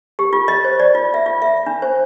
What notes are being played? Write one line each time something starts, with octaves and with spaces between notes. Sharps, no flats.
G4
F4
D#5
C5
D5
F4
E5
F4
E5
D4
C5